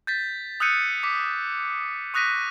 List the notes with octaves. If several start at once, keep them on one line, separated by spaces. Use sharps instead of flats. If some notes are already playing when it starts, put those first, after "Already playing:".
G6 A6 B6
D#6 E6 F#6 G6 C#7 D#7
D6 B6
C#6 D#6 F#6 A#6 B6 D#7